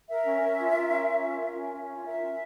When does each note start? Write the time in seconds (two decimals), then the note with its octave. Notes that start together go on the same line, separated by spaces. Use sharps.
0.08 A#4 E5
0.24 C#4
0.41 C#4
0.58 F4
0.74 A#4
0.91 C#4
1.07 C#4
1.23 F4
1.39 A#4
1.55 C#4
1.73 C#4
1.89 F4
2.05 A#4 E5
2.21 C#4